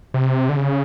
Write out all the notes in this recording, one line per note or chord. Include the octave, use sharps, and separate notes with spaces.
C3
D3
C#3